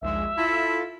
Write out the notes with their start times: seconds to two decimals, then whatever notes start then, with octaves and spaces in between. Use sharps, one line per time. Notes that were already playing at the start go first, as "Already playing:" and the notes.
0.02 A#1 D#2 G#3 E5
0.37 E4 F4 A4